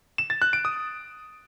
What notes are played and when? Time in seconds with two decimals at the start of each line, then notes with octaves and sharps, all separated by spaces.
0.18 E7
0.30 A6
0.42 F#6
0.53 D7
0.65 D#6